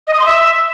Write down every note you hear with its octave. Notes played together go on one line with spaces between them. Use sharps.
D#5
D#6
C6
E5